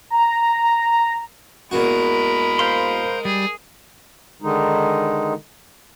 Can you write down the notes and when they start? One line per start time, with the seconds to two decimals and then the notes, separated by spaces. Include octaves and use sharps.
0.10 A#5
1.71 E2 G#3 A#3 F#4 A#4 B5
2.59 C5 F5 C6
3.25 G3 G#4
4.42 D3 D#3 G#3 D#4